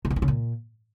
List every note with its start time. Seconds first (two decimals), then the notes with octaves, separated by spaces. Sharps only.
0.05 C3
0.10 B2
0.16 D#3
0.22 C#3
0.28 A#2